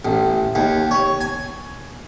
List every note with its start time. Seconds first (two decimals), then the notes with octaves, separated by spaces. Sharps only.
0.05 A1
0.55 D#2
0.91 C#5
1.21 G#5